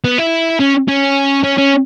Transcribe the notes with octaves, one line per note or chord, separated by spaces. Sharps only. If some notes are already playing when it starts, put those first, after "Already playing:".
B3
E4
C#4
C#4
C#4
C#4